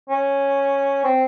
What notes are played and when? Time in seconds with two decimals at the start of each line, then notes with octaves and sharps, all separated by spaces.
0.10 C#4
1.04 C4